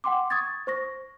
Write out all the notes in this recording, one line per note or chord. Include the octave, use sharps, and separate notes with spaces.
F#5 G5 C6 D6
C#6 D#6 G#6 A6
C5 C#6 A#6